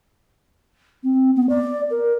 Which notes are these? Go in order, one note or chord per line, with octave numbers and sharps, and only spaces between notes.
C4
B3
D5
A#4